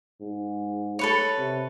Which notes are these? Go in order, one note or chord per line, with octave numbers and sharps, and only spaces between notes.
G#2
A4 B4 C#5
C3